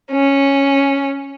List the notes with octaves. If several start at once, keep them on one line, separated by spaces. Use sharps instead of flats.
C#4